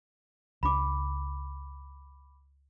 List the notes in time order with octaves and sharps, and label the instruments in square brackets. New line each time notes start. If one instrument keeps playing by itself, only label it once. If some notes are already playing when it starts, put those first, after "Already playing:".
[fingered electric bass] C#2 D4 [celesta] B5 D6